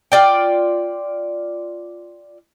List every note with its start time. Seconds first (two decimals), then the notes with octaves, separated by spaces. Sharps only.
0.12 F4 D5 G5